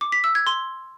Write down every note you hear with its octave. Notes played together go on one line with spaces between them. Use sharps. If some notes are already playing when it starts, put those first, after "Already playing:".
D6
B6
E6
G#6
C6